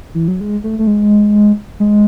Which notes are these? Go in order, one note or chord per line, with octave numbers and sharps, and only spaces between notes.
E3
F#3
G#3
A3
A3
G#3
G#3